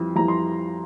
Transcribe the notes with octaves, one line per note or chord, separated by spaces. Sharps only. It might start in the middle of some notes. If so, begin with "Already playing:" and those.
Already playing: F2 E3 G3
F2 E3 G3 A#5
C6